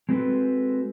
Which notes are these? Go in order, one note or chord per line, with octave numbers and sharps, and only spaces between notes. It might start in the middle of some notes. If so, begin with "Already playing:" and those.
G#3 C4 F#4 A4 B4